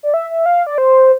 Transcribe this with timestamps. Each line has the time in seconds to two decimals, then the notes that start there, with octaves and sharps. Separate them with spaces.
0.03 D5
0.14 E5
0.30 E5
0.46 F5
0.67 D5
0.78 C5